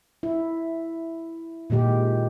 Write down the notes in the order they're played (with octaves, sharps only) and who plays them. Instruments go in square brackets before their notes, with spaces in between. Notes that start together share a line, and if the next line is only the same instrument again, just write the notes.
[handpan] E4
A#2 D#3 G#3 G4